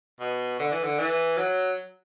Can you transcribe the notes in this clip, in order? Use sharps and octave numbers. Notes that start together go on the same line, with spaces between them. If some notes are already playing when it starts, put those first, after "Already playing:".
B2
D3
E3
D3
E3
F#3